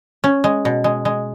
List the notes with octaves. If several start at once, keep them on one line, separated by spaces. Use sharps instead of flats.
C#4
G#3
B2
G#3
G#3